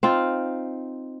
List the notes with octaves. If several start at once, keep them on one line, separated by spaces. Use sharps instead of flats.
C4 D#4 F4